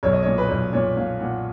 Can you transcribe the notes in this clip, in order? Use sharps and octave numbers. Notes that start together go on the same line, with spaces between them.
B1 C#5
D#5
C#5
A#2
B4
B1
A#2 C#5
A#2 F5
A#2 F#5